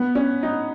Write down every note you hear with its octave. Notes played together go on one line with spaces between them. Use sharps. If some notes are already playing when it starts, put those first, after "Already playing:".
Already playing: B3
C#4
D#4